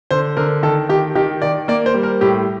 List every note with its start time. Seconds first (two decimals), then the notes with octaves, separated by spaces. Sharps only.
0.11 D3 C5
0.37 D3 A#4
0.63 D#3 A4
0.89 D#3 G4
1.15 D#3 G4
1.42 D#3 D5
1.68 A#3 D5
1.86 C5
1.94 G3
2.03 A#4
2.21 A2 G4